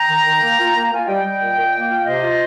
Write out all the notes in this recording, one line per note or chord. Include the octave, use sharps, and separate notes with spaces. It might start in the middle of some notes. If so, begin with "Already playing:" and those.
Already playing: G5 A#5
D#3
D#3
A#3
F4
A#3
A#5
F4 G#5
G3 D#5 G5
G3
A#2
A#2
A#3
F4
C3 C5 D#5
F4